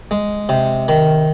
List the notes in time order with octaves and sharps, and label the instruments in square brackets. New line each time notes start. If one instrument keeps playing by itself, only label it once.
[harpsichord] G#3
C3
D#3